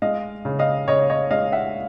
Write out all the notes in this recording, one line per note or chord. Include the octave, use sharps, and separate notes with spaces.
G#3 D#5 F5
C#3
D#5 F5
C#3 C#5 D#5
C#5 D#5
G#3 D#5 F5
E5 F#5